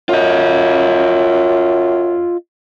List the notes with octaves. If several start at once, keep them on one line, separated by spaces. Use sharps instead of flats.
F#2 F4 D#5